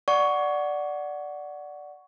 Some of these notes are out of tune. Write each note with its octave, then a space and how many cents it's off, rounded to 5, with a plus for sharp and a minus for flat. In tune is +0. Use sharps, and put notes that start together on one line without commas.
D5 +0 F#5 +0 C#6 +10